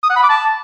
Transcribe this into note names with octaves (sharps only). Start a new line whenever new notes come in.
D#6
F#5
B5
D6
A5